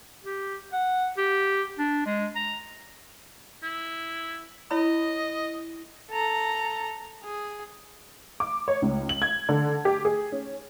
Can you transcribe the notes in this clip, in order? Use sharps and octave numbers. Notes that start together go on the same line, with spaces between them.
G4
F#5
G4
D4
G#3
A#5
E4
E4 C#5 D#5 B5
A4 A#5
G#4
D6
C#5
C#2
F#7
G#6
D3
G4
G#4
C#4